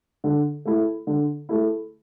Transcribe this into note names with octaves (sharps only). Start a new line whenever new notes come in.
D3
A3 E4
D3
A3 E4